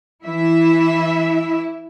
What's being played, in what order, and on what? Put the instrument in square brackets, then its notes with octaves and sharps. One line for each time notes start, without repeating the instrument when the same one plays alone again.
[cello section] E3 E4 E5